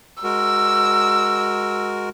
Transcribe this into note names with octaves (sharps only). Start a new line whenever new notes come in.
G#3 F#4 A#4 E6